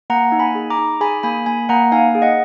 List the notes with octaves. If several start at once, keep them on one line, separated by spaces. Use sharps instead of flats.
A#3 F#5 A#5
D#4
G#5 B5
G#4
A#5 D6
D#4
G#4 G#5 B5
A#3 G#5 B5
A#3 G#5 B5
A#3 F#5 A#5
D#4 F5 G#5
G#4
D#5 F#5